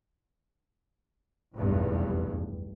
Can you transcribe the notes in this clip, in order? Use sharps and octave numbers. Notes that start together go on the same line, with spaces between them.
F1 B1 E2 G2